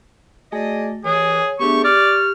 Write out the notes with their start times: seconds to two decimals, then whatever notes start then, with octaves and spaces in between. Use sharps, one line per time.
0.52 A3 F#4 G#4 D5 D#5
1.04 D#2 E3 G#4 C#5
1.59 E2 A3 B3 D4 G4 G#4 C#6
1.84 G4 D5 C#6 F6